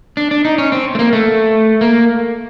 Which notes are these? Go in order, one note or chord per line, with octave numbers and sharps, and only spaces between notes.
D4
D4
D#4
C#4
C4
A3
A#3
A3
A#3